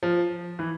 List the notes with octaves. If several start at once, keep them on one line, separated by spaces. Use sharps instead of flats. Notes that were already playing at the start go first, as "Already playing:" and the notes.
F3
E3